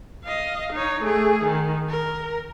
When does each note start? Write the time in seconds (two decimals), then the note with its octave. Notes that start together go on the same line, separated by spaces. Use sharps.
0.24 D#5 F5
0.73 D#4 C#5
1.03 A3 G#4
1.43 D#3
1.89 A#4